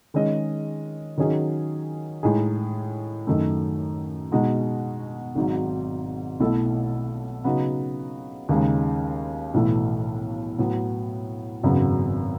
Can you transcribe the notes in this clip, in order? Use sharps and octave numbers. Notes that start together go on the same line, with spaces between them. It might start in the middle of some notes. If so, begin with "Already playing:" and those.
D#3 G#3 C#4 G#4 D#5
D#3 F#3 C#4 G#4 D#5
A2 G#3 D#4 G#4
F#2 D#3 A3 D#4
B2 G#3 D#4 F#4
G#1 G#2 F#3
B1 B2 A3 E4 A4
C#3 F#3 B3 D#4 F#4
D#2 C#3 G#3 D#4
B1 A2 E3 A3
A2 F#3 B3
G#1 F#2 C#3 F#3 B3